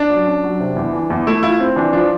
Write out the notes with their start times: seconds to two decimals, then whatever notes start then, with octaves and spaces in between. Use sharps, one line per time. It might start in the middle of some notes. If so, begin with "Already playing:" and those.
Already playing: D4
0.10 F#3
0.27 C#4
0.44 F#3
0.60 C3
0.76 E2
0.93 E3
1.10 E2
1.27 A3 E4
1.43 E4 F4
1.60 C4
1.76 E3 D4
1.93 F3 D4